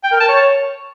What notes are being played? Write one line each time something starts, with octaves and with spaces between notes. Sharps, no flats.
G5
A#4
A5
C#5